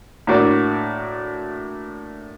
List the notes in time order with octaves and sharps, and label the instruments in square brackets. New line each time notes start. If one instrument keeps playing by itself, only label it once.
[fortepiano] A2 A#3 D4 F#4 D5